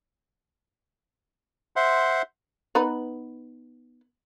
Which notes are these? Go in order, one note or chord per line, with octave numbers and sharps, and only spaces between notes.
C5 E5 F#5 C6
B3 D#4 B4